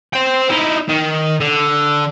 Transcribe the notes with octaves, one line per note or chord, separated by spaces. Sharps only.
C5 G5
D#4 E4
D#3
D3